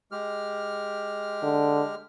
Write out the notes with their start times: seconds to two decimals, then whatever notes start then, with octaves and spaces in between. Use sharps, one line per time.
0.12 G#3 G4 F6
1.43 D3